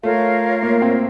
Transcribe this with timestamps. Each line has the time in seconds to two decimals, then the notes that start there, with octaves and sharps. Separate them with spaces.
0.03 A3 F4 A#4 C#5 F5
0.63 A#3
0.82 C4